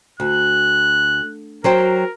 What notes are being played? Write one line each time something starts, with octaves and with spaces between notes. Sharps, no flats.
D2 F#6
F#3 A#4 C5 G5